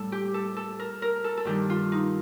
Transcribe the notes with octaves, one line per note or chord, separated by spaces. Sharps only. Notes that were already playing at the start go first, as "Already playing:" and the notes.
Already playing: A2 G3 A4
G4
A4
A4
A#4
A#4
A4
A4
G2 D#3 G3 G4
F4
D#4